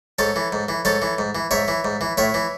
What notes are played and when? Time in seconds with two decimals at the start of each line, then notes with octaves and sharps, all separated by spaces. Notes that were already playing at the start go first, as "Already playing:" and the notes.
0.19 G#2 A4 C#5
0.36 E3
0.53 G#2
0.69 E3
0.85 G#2 A4 C#5
1.02 E3
1.18 G#2
1.35 E3
1.51 G#2 C#5 E5
1.68 E3
1.85 G#2
2.01 E3
2.17 A2 C#5 E5
2.34 E3